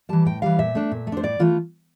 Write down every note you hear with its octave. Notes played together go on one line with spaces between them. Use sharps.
E3 G3 A5
A2 G5
E3 G3 F5
A#2 E5
A3 D4
A#2
A3
D4 C5
A2 D5
E3 A3 F4